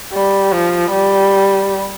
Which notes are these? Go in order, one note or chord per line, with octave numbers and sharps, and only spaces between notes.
G3
F3
G3